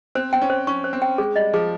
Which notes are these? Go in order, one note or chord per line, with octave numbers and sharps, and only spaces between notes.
C4 C5
C4 G5
C#4
C5
C#4 C#6
C5
C4
G5
G#3 G#4
G3 D#5
F3 G#4